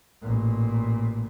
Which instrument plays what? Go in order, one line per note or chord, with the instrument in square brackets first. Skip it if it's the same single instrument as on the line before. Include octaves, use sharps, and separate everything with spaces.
[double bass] A1 A#2